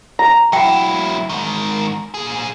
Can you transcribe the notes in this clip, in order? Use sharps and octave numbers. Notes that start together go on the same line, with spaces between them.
A#5
F#3 E4 F#5 G5
G#2 D#3
A#2 G#4